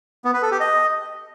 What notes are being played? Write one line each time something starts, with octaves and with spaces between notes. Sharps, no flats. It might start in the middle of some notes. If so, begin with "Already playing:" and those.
B3
B4
A4
G4
D#5